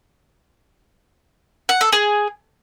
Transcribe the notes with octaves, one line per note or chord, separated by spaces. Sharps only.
F#5
A4
G#4